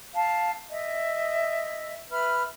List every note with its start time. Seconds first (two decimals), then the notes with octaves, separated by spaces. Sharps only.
0.15 F5 A5
0.70 D#5 E5
2.11 B4 E5 B5 F6